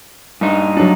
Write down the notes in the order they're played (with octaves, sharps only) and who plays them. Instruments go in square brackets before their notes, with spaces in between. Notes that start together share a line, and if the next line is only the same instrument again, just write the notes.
[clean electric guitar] G2 D#4
[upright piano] F#3 D4